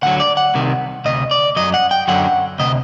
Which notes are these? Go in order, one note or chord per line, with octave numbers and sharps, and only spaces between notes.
D2 D3 F#3 F#5
D5
F#5
C2 C3 D#3
D2 C3 D#5
D5
F#2 F#3 D#5
F#5
G5
F#2 D3 F#3 F#5
D2 C3 D#5